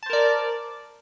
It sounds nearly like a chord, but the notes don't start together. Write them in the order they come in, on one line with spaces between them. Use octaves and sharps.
A5 C5 A#4 D5